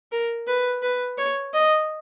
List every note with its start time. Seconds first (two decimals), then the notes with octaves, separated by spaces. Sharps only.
0.12 A#4
0.47 B4
0.82 B4
1.18 C#5
1.53 D#5